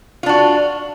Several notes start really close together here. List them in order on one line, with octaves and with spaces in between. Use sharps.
F4 D4 F#4